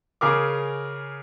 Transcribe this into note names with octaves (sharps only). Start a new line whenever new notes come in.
C#3 G#4 A#4 D6